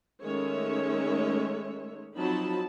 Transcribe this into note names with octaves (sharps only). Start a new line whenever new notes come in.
D#3 G#3 A3 C#4 C#5 E5
F3 F#3 C4 D#4 A5 B5